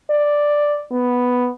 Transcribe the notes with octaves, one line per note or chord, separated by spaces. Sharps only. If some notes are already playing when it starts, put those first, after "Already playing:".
D5
B3